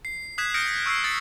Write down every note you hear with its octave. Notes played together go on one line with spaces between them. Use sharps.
C7
D#6 F#6 G#6 B6 E7
D#6 F6 G6 A#6 C#7 D7
C#6 E6 G#6 C7
D#6 A6 C7 C#7